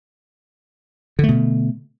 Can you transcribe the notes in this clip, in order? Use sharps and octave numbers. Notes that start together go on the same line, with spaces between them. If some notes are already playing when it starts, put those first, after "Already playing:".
B2 D3 A3